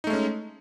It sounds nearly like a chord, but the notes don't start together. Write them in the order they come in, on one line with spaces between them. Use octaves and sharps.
D#4 A3 G#3 C#4